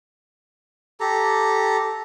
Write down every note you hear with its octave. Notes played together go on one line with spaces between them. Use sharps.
G4 A4 A#5